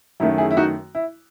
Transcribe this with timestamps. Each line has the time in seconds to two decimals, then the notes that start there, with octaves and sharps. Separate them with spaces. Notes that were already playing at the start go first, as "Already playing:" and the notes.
0.20 F#2 D#3 A3 E4
0.38 E4 G#4
0.51 E4
0.57 D#4 F#4
0.95 E4